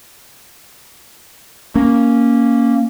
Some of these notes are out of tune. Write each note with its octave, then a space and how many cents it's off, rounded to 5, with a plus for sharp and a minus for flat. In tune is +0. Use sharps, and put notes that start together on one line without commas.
A#3 +0 C#4 +0